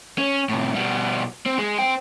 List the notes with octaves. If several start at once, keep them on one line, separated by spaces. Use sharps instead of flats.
C#4
A2 C3
B2 G3
C4
G#3
C5 G5